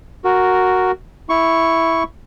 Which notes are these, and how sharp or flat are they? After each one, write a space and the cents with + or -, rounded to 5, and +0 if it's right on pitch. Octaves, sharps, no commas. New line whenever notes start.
F#4 +0 A#4 -5
E4 +0 C#6 +0